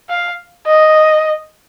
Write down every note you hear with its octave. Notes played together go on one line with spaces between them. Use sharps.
F5
D#5